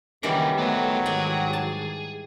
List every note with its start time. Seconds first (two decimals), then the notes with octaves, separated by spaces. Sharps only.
0.23 F#2 D#3 E3 G3 A#3 E4 G4 A#4
0.58 F#3 A3 B3 A4 C5
1.06 G#2 D#3 G#4 D5 G5
1.53 A5